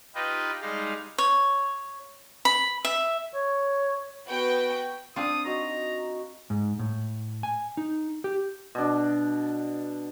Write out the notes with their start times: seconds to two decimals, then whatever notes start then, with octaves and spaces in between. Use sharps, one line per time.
0.15 D#4 F4 G4 B4 D#5
0.62 G3 G#3 D#4 F5
1.18 C#5
2.45 B5
2.85 E5
3.33 C#5
4.29 B3 F#4 B4 G5
5.16 C4 D4 F4 D#6
5.45 D#4 F#4 C#5 A#5
6.50 G#2
6.79 A2
7.43 G#5
7.77 D#4
8.24 G4
8.75 B2 D4